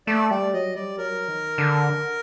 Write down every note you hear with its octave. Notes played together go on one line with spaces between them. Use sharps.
A3 D5
G3 D5
F#3 D#5
G3 D5
F#3 A#4
D#3
D3